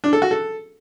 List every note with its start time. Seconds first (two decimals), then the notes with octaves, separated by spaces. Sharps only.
0.04 D4
0.13 A4
0.22 F#4
0.31 A4